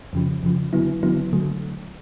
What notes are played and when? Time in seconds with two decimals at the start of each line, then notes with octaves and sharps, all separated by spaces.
0.13 F2 C#3 F3
0.43 F2 C#3 F3
0.73 D3 F#3 B3 E4
1.03 D3 F#3 B3 E4
1.33 D3 F#3 A3